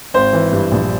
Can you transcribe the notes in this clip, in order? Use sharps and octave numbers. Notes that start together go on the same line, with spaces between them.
G#1 C5
E3
G2
A#1